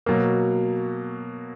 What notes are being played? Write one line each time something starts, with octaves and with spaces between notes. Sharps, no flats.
B2 F#3 A#3